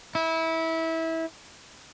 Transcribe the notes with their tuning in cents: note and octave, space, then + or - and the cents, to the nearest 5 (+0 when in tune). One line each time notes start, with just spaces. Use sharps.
E4 -20